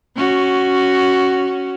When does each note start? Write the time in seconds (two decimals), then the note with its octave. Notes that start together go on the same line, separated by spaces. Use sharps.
0.16 C#4 F#4